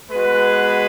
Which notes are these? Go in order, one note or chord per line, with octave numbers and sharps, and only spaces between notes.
G#3 B3 F#4 B4